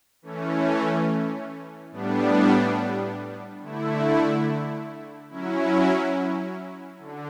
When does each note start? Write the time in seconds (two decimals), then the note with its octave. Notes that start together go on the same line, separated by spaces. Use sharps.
0.22 E3 A3 C#4
1.91 A2 G3 B3 D4
3.61 D3 A3 E4
5.30 F#3 C#4 E4
6.99 D3